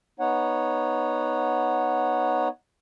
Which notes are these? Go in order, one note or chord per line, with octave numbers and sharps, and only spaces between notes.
B3 D#4 C#5 F#5